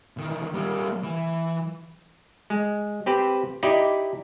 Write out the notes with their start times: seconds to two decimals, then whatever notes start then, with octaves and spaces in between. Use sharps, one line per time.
0.18 D#3 E3
0.54 G3 A#3
1.03 E3
2.50 G#3
3.06 C4 G4 B4 C5
3.63 D#4 E4 G4 D5 D#5